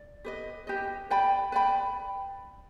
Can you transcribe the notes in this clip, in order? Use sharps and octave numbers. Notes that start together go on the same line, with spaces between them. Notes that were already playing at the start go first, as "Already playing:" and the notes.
Already playing: D5
G4 B4 D#5
G4 B4 D#5
B4 D5 G5 B5
B4 D5 G5 B5